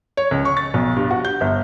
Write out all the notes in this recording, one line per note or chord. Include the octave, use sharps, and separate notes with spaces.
C#5
C#2
C#6
A6
B1
G2
F#4
G6
G1